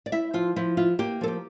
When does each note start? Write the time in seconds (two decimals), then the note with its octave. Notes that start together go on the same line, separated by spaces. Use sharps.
0.06 D5
0.12 E4 E5
0.34 F3 F4
0.56 F3 E4
0.77 E4 F4
0.99 A#3 G4
1.21 F3 A4
1.28 G4